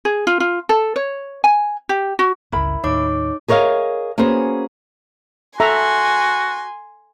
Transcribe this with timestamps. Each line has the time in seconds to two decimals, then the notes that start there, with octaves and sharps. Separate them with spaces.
0.05 G#4
0.27 F4
0.40 F4
0.69 A4
0.96 C#5
1.44 G#5
1.89 G4
2.19 F#4
2.52 G1 C#2 E4 A#4 B5
2.84 D#2 A2 D#4 C#5 D6
3.48 G#4 A#4 C#5 D#5 F5
4.18 A#3 B3 C#4 F#4 G#4 C5
5.60 F#4 A4 E5 G#5 A#5 C6